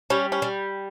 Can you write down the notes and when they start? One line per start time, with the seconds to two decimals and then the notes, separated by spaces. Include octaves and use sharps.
0.10 G3 C#4
0.32 C#4
0.42 G3